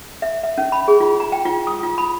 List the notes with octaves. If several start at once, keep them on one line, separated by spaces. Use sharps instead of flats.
E5
E5
C#4
B5
G#4
F4
A#5
G5
F4
D#6
F4
B5